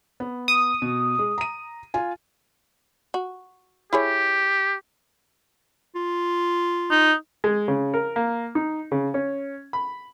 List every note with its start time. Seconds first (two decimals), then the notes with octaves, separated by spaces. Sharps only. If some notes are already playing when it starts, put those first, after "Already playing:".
0.20 B3
0.48 D#6
0.82 B2
1.19 G#3
1.38 A#5 D#7
1.94 F4 G#5
3.14 F#4
3.93 E4 G4 G#4 C#5
5.95 F4
6.91 D#4
7.44 G#3
7.68 C#3
7.94 A#4
8.16 A#3
8.55 D#4
8.92 C#3
9.14 C#4
9.73 B5